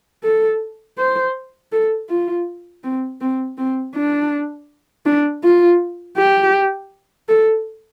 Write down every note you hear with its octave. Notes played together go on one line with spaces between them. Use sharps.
A4
C5
A4
F4
C4
C4
C4
D4
D4
F4
G4
A4